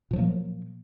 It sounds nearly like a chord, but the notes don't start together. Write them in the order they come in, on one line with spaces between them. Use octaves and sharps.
A#2 F3 F#3 A#3